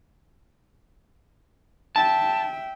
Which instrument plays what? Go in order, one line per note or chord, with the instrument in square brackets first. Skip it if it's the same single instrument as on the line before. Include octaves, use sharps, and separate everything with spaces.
[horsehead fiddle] E5 G5 [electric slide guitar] A5